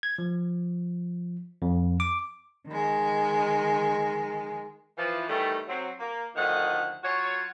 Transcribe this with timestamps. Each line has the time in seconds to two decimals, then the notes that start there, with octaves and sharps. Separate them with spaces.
0.03 G#6
0.18 F3
1.62 F2
2.00 D6
2.69 D#3 G#3
4.97 E3 F3
5.28 D#3 E3 G3 A3
5.68 F#3 C4
6.00 A#3
6.36 D2 D3 D#3 F3 A3 F#5
7.03 F#3 F4 F#4 C#5